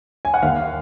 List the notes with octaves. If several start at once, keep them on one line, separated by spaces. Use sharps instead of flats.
G#5
F#5
D#2 F5